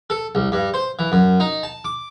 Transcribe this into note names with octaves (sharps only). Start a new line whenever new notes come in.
A4
C2
G2
C5
E3
F#2
D#4
A5
D6